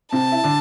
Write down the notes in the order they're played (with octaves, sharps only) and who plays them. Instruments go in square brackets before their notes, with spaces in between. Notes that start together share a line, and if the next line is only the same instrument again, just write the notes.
[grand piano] C3 C4 [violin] A5
[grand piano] E4
D3 D4